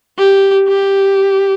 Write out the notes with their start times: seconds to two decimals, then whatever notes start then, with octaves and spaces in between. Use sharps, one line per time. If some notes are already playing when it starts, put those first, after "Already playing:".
0.18 G4
0.68 G4